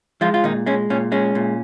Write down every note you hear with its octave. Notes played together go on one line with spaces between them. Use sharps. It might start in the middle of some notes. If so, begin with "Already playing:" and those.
F3 G#3 F4
F4
A#2 D#3 D#4
G#3 C#4
A#2 C#4
G#3 C#4
A#2